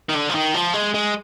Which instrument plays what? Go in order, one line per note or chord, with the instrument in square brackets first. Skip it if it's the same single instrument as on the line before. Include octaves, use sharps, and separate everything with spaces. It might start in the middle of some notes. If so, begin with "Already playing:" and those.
[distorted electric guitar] D#3
D3
F3
D#3
F3
G#3
G#3